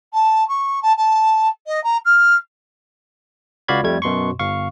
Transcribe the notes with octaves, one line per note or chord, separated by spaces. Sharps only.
A5
C#6
A5
A5
D#5
A#5
F6
C#2 F#4 D5 F5 B5 G#6
F2 G3 A3 G#6
F#2 B2 C6 C#6
G1 F5 C#6